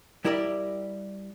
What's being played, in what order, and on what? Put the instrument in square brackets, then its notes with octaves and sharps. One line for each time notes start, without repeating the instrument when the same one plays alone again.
[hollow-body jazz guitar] G3 E4 G4 A#4 D5